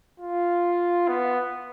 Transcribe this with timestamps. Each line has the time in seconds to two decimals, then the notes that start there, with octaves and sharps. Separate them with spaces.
0.20 F4
1.08 B3